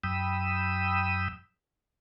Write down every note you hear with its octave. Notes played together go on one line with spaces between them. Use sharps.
F#2 G5 B5 D#6 E6